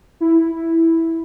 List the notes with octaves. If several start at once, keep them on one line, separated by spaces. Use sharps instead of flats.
E4